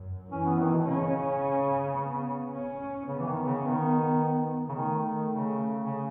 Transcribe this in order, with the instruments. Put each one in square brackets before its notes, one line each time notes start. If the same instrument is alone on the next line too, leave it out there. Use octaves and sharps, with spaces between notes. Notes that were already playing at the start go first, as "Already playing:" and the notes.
Already playing: [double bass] F#2
[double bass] E3 [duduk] C#4
[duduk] B3
D#3
B2
[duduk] C#3 [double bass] C#4
[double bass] B3
C#4
[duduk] C#3 [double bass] B3
[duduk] E3
D#3
C#3
D#3
C#3
[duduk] D#3 [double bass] A3
[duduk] D#3
C#3
C#3